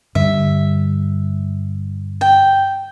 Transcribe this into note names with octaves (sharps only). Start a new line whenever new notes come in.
G2 D3 E5
G5